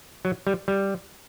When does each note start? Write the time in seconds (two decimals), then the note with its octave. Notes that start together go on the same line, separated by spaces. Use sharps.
0.25 F#3
0.47 G3
0.68 G3